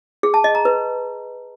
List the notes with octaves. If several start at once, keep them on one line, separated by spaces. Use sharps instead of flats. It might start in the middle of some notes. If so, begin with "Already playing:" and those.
G#4
A5
D#5
A#5
B4